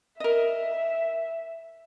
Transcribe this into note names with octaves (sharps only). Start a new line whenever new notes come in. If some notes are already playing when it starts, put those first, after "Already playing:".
A#4 D#5 E5